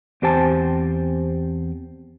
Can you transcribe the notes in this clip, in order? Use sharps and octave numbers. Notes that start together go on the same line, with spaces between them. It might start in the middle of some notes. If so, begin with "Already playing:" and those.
E2 C4 G4 C5 G#5 A5